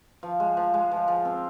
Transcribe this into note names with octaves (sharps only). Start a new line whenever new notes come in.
F3
G#3
F3
G#3
F3
F3
C4